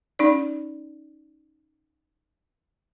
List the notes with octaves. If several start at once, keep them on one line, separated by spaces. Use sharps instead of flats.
C#4 D#4 D5